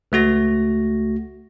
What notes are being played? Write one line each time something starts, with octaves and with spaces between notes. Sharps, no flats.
C#2 A3 F#4 A#6